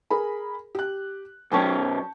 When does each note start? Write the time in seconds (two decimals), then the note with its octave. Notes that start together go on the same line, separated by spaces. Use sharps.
0.10 G#4 A#4 B5
0.75 G4 F#6
1.52 B1 F#2 C#4 G5 A5 C#6